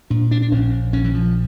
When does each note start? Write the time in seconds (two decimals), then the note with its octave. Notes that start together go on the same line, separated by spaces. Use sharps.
0.10 A#2 D4
0.31 D4
0.42 D4
0.52 A#1 C#4
0.93 A#1 C#4
1.04 E3
1.14 F3